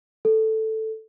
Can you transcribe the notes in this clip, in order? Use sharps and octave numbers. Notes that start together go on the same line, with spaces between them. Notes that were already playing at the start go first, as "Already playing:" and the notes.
A4